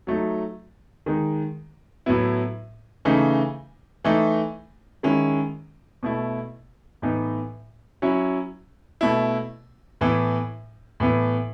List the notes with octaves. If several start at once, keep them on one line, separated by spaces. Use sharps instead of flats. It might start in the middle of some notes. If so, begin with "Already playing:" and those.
F#3 A3 D#4
D#3 G#3 D#4
A2 F#3 B3 E4
C#3 E3 A3 D#4
E3 A3 D#4
D#3 G#3 C#4 E4
B2 A3 E4
A2 E3 B3 D#4
F#3 C#4 E4
B2 A3 E4
A2 E3 B3
A2 E3 B3